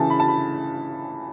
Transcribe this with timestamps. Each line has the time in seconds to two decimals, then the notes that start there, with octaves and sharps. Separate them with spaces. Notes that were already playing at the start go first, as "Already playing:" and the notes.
Already playing: C#3 E3 G#5 A5
0.10 B5
0.20 A5
0.28 B5